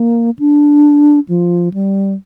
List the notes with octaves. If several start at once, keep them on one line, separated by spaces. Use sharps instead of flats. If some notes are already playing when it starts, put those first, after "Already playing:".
Already playing: A#3
D4
F3
G3